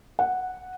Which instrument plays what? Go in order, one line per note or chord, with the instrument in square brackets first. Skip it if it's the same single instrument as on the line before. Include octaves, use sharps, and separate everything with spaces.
[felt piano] F#5